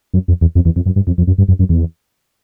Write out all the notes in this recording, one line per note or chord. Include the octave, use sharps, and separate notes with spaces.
F#2
F2
E2
F2
E2
F2
F#2
G2
F2
F2
F#2
G2
F#2
F#2
E2